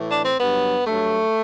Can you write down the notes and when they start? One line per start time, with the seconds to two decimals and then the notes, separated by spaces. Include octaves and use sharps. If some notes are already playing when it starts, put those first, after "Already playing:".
Already playing: A2 E3
0.09 D4
0.24 C4
0.39 G2 F#3 B3
0.85 G2 F#3 A3